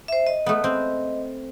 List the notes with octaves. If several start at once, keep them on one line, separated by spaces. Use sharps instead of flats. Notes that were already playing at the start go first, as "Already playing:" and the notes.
C5 E5
D#5
A3 B3
C4